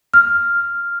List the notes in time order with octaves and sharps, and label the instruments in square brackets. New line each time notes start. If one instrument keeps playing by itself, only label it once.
[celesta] F6